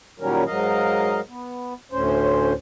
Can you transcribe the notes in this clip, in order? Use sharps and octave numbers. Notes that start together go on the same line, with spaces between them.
A#2 D#3 F#3 G3 C#4 A#4
G#2 F#3 A#4 D#5 F5
B3
D2 A2 C#4 C5